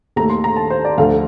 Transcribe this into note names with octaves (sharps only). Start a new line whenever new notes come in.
D#2 D#3 A3 A#5
C6
A#5
A5
C5
D5
D2 D3 F3 F5